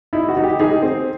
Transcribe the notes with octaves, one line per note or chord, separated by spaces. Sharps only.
D#4 E4
F#4
D#4
G4
D#4 G#4
C4